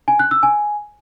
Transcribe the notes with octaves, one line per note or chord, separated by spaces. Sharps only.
G#5
F#6
E6
G#5